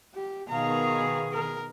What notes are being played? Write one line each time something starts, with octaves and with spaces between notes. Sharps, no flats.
G4
B2 D#3 G#4 F5 A#5
A#4